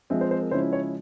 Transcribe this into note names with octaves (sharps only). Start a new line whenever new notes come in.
F3 G#3 C4 E5
C5
C5
A#4
C#3 F3 G#3 C#4 E4 C5
C#5